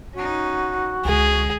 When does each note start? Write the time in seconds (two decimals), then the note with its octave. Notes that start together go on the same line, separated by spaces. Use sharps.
0.14 C#4 D#4 F#4
1.05 C#2 D3 G#3 G#4